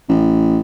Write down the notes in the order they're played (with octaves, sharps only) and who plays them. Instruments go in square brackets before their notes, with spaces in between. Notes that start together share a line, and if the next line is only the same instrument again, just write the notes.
[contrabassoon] A1